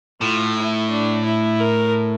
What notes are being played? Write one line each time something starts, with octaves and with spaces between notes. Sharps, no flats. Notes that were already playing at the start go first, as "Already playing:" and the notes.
A2 F4
E4
D4
E4
A#4